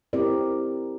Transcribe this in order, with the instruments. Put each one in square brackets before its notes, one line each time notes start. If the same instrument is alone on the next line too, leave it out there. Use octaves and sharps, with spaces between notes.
[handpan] C4 E4 G4 A#4 D5